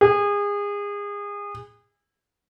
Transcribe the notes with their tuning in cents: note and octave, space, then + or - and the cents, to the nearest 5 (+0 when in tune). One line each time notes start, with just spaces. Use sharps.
G#4 -30